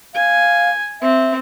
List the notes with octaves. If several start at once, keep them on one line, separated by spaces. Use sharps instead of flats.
F5 G#5
C4 E5